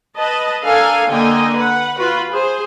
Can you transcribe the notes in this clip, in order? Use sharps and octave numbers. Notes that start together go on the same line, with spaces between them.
B4 D#5 A5
D4 A4 A#4 F5 G#5
D3 A#3 D#5 G5 G#5
B4 F#5
F4 F#4 B4
G#4 C5